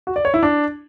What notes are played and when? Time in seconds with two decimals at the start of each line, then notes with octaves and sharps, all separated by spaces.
0.07 F#4
0.16 D5
0.25 C#5
0.34 E4
0.43 D4